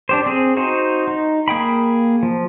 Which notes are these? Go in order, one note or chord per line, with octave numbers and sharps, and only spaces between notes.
D4 G4 C5
C4 G#4
D#4 F#4 C5
D#4
A#3 G#4 G5 B5
F3